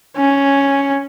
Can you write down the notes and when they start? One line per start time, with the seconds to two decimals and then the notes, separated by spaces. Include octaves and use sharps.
0.16 C#4